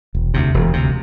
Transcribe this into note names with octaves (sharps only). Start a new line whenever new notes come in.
E1
D2 C3
E1
D2 C3